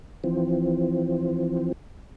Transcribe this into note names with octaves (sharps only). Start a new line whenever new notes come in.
E3 F3 C4